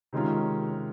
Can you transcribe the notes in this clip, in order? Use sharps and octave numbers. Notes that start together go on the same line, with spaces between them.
C3 D#3 G#3 C#4 F4